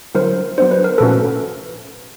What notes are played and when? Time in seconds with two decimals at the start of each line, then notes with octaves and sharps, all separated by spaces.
0.15 D3 F#3 B3 E4 A#4 C5
0.58 F#3 B3 D4 C5
0.71 B4
0.84 A#4
0.98 A#2 F3 A3 C#4 F#4 A4 B4